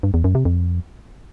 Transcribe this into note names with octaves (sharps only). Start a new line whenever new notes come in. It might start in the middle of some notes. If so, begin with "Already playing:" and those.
G2
E2
F#2
C3
F2